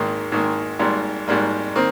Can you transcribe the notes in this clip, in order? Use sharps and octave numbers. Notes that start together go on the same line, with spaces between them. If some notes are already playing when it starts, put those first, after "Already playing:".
Already playing: G#1 G#2 D#3 A#3
G#1 G#2 D#3 A#3
G#1 G#2 G3 A#3
G#1 G#2 G3 A#3
D#3 A#3 C4